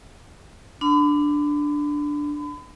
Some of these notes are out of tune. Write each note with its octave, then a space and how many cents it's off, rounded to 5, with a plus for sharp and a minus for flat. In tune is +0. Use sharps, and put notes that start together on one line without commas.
D4 +0 B5 +40